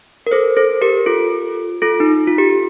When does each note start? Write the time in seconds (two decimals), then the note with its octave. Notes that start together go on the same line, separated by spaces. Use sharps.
0.27 A#4
0.31 A4 C5
0.57 A4 C5
0.82 G4 A#4
1.06 F4 A4
1.82 F4 A4
2.00 D#4
2.27 F4
2.38 G4